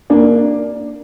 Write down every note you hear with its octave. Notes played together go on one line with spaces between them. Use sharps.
A#3 D4